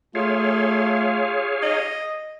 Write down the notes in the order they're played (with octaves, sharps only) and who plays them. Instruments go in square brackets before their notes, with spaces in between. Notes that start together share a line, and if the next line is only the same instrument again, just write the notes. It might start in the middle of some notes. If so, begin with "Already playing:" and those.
[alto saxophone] A3 [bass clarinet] F4 [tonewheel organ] G#4 C#5 F5
[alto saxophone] D#5